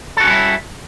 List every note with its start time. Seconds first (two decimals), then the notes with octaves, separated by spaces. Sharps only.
0.17 A4
0.20 F#4
0.24 C#4
0.27 G3
0.30 E4